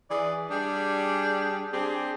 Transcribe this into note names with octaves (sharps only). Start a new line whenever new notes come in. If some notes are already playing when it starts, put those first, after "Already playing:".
E3 G#4 D5
G3 D4 G#4
C4 D4 G4 G#4